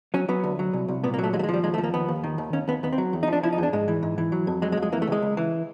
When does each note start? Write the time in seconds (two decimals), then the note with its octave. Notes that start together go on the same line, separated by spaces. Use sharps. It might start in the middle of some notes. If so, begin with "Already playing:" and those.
0.14 F#3 C#4
0.28 F#3 B3
0.44 D2
0.59 F#3
0.73 C2
0.88 C2
1.04 A#2 B3
1.14 A#3
1.19 F#3 A3
1.33 D#2 G#3
1.39 A3
1.43 G#3
1.49 F3 G3
1.64 D#2 G#3
1.74 A3
1.78 F3
1.84 A#3
1.94 D#2 B3
2.08 D#2
2.24 D#3
2.38 D#2
2.53 D#2 C#4
2.68 D#2 B3
2.83 D#2 B3
2.93 C4
2.98 F#3
3.13 E2
3.23 D#4
3.28 F3
3.33 D4
3.43 F3 E4
3.52 D#4
3.58 E2 D4
3.73 G#2 G#3
3.88 E3
4.03 G#2
4.18 E3
4.32 F#3
4.47 F2
4.62 F#3 G#3
4.72 G#3
4.77 F2
4.82 G#3
4.92 E3 A#3
5.02 A3
5.07 C#2 G#3
5.22 C#2
5.37 E3